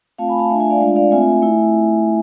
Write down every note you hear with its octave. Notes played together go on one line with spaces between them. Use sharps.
A3 C4 F4 F5 A5
G#5 B5
F5 A5
A3 D4 F4 E5 G#5
E5 G#5
D5 F5
G#3 D4 F4
D5 F5
A3 C4 F4 E5 G#5
A3 E4